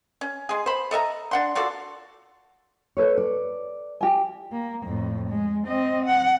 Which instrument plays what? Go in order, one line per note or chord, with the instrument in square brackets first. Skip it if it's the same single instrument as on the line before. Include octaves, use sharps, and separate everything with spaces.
[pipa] C#4
G#3 G#4
C5 B5
A4 D#5 E5 A#5
D4 F#5 C6
F4 F#4 A4 D5
[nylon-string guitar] A4 B4 C#5
D5
[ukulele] G4 G#5
[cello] A#3
F2 A2
G#3
C4 D#5
F#5